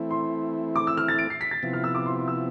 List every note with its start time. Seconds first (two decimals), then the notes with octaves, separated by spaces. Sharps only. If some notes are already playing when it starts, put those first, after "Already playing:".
Already playing: E3 A3 C4 E4
0.11 C6
0.76 D6
0.87 E6
0.97 F6
1.08 A6
1.19 D7
1.30 C7
1.41 B6
1.51 A6
1.63 C3 F3 B3 E4
1.73 F6
1.84 E6
1.95 D6
2.06 C6
2.17 C6
2.28 E6